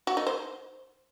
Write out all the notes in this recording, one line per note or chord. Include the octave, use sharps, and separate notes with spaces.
F#4
D#4
C5